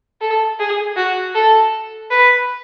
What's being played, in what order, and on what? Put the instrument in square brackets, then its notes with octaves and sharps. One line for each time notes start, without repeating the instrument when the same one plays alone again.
[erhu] A4
G#4
F#4
A4
B4